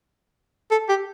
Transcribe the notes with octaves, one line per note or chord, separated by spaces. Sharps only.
A4
G4